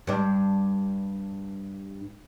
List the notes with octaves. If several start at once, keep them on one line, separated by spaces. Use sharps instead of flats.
G2 D4